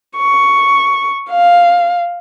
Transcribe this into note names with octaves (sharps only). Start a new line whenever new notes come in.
C#6
F5